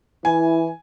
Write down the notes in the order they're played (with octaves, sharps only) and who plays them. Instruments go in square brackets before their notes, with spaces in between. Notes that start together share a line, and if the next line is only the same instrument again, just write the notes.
[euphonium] E3 [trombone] E4 [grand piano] G#5